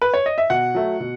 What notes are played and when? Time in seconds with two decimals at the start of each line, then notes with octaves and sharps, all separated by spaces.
0.02 B4
0.14 C#5
0.26 D#5
0.38 E5
0.50 B2 F#5
0.75 F#3 A3
1.00 B2